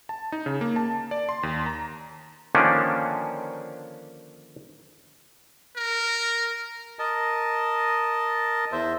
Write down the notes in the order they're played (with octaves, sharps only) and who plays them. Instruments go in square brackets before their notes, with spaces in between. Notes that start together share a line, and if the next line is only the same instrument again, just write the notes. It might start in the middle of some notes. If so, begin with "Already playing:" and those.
[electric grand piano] A5
D#4
C#3
A#3
A5
D5
C6
D#2
A#5
[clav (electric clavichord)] D3 D#3 F3 A#3 C#4 D4
[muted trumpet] A#4
[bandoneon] A#4 D#5 A5
E2 C5 E5